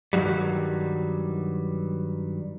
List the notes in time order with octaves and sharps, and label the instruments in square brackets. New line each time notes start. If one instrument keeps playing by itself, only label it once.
[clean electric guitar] G2 A#2 D#3 F#3 G3